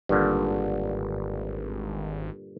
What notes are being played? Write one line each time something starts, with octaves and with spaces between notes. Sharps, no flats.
G#1 G2 A#2 D3